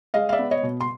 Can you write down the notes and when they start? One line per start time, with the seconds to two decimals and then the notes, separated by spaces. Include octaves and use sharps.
0.14 G#3 D#5 F5
0.29 F5
0.32 D5 E5
0.39 B3
0.51 C#5 D#5
0.63 B2
0.81 C6